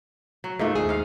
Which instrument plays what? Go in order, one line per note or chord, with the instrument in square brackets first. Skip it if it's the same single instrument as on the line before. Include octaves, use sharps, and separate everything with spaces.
[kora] F#3
[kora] G#2 A3 [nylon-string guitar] A#3 D#4 F4
[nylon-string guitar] D#2 G#4
[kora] G#2 F5